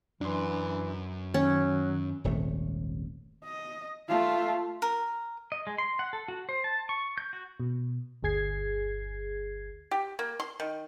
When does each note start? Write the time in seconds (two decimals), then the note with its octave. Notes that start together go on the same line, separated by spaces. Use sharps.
0.21 F#2 E3 D4 C6
1.34 D#3 F#3 C#4
2.24 D#1 G#1 C3 A3
3.45 D#5
4.09 A3 F4
4.82 A#4
5.52 D#5
5.67 G#3
5.78 C6
5.99 F#5
6.13 A4
6.28 F#4
6.49 C5
6.64 A5
6.89 C#6
7.18 G6
7.33 F#4
7.60 B2
8.23 G1 D2 G#4 G#6 C7
9.91 G4
10.19 A#3
10.40 C6
10.60 D#3